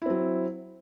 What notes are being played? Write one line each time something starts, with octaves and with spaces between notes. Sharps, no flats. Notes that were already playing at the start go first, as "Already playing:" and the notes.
F#3 C4 E4